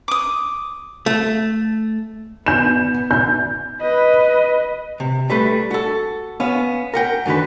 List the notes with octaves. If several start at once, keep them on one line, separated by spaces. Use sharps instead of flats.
D6 D#6
A3
B3 G6 E7
G6
B4 D#5
C3
G3 A3 B4
F#4 A4
B3 C#4 F5
A#4 F#5 G5
F#2 D3 D#3 B4